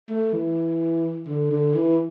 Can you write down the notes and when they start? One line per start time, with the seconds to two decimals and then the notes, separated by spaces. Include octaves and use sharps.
0.09 A3
0.33 E3
1.27 D3
1.51 D3
1.75 E3